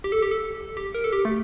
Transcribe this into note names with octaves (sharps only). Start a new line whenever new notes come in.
G4
A4
G4
A4
G4
A#4
A4
G4
A3